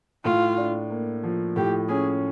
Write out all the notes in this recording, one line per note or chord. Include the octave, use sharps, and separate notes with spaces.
A2 F4
D4
A#3
F3
A2 G4
C#4 G#4